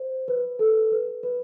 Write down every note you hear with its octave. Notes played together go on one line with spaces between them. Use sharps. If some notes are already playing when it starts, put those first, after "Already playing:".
Already playing: C5
B4
A4
B4
B4